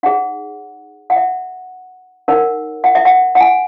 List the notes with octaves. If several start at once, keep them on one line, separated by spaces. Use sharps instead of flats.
D#4 G#4 C#5 F#5
F#5
E5
D#4 A#4 C#5 F#5
F#5
E5
F#5
F#5
G#5